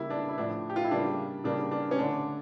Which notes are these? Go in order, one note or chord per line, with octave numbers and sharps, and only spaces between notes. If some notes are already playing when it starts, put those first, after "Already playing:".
Already playing: C#3 G3 A#3 E4
D4
E4
A2 F3 A3 D4
G4
F4
E4
C#3 G3 A#3 D4
C#3 G3 A#3 D4
D4
C#4
D3 A3 D4